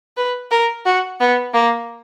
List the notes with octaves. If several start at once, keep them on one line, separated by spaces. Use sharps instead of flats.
B4
A#4
F#4
B3
A#3